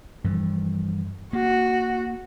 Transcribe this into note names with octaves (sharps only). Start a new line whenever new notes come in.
G2 E3 F3
A#3 F#4